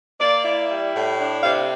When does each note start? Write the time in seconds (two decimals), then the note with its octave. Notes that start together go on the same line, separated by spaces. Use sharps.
0.20 A#3 D5
0.44 E4
0.69 G3
0.94 A2
1.18 D4
1.42 C3 F5